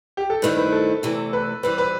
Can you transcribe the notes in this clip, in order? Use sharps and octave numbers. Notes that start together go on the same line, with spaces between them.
G4
A4
G2 D#3 A3 C4 E4 B4
B4
A4
E2 C3 E3 A3
B4
E3 G3 C4 B4
B4